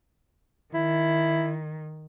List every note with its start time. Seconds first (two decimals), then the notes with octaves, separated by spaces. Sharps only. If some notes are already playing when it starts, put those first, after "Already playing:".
0.74 D#3 E4